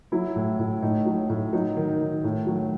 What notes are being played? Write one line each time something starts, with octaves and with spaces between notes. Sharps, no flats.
F#3 E4
A2
A2
A2 D#4
F#3
A2
F#3 D#4
D#3
D#4
D#3
A2
F#3